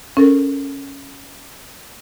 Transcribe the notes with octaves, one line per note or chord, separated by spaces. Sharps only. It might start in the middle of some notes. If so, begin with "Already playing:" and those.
C#4 A4 A#4